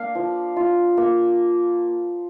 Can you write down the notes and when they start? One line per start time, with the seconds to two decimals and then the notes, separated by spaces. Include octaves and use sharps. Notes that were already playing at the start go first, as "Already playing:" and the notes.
Already playing: A#3 D4 F5
0.15 F3
0.56 F4
0.97 A#3